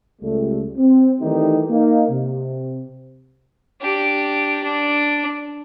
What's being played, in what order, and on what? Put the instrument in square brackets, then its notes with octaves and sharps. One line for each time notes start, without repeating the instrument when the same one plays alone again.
[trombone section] C#2 G3 A3
C4
D#3 E3 G3 A3 D#4 G4
A#3 D#4
C3
[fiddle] D4 G4
D4